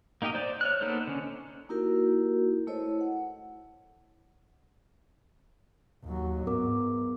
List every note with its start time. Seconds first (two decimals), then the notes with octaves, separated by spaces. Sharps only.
0.22 A#3 D#4 G4 A#4 D#5
0.34 C5 D5 G6
0.61 C#5 F6 F#6
0.81 A#3 B3 D#4 A4 C5
1.07 D3 C#4
1.69 A#3 D#4 E4 F#4 G4 A#4
2.67 A3 E4 A4 C5 C#5 D#5
3.01 F#5
6.04 D#2 F#3
6.47 G#2 B3 A#4 D6